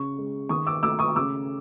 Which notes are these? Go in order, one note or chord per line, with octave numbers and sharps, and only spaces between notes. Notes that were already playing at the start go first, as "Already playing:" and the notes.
Already playing: C#3 C#6
G#3
D#3 C#6 D#6
D6 E6
A3 D6 E6
C#6 D#6
C#3 D6 E6